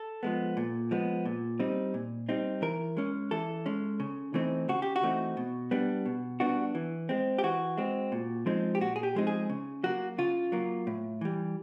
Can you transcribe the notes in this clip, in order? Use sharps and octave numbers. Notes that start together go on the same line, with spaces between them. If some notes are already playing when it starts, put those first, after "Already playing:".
Already playing: A4
F3 G#3 B3
A#2
F3 G#3 B3
A#2
G3 C4 D#4
A#2
G3 C4 D#4
E3 A#4
G#3 C#4
E3 A4
G#3 C#4
C#3
E3 A3 C4 D#4
C#3 F#4
G4
F#4
E3 A3 C4 D#4
B2
G3 B3 D4
B2
G3 B3 D4 F#4
E3
G#3 C4
G4
E3 F#4
G#3 C4
A#2
F3 G#3 C4 D#4
G4
A#2 F#4
G#4
G4
F3 G#3 C4 D#4
G#4
C#3
F#3 A#3 F#4
C#3 F4
F#3 A#3
A2
E3 G3